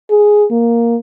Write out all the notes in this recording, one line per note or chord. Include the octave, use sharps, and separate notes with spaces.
G#4
A#3